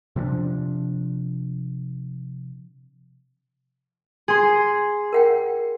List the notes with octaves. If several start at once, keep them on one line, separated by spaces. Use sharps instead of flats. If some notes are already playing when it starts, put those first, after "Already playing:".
C3 F3 C4 D4
G#4 C6
A#4 F#5 G5